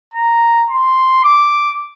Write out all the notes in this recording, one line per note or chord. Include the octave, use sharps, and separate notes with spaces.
A#5
C6
D6